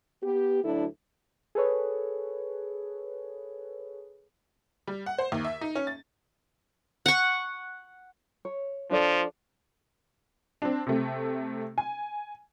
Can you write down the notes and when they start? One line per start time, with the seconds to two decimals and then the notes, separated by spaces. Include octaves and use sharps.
0.23 B3 G4
0.64 D2 F#3 D4 E4 A4
1.55 G#4 A4 B4 C#5
4.87 G3
5.06 F#5
5.18 C5
5.32 D#2
5.44 E5
5.61 D#4
5.75 C#4
5.87 A6
7.06 F#5 C#6
8.45 C#5
8.91 F3 D4 A4 D5
10.62 C4 D4
10.87 C3 A3
11.78 G#5